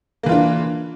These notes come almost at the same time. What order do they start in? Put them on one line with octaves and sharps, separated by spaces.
A#3 E3 F4 D4